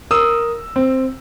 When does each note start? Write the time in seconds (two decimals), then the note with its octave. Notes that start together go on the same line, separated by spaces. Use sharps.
0.11 A#4 D#6 E6
0.76 C4